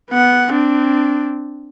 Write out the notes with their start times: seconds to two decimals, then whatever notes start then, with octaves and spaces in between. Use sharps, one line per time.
0.11 B3 F#5
0.51 C4 D4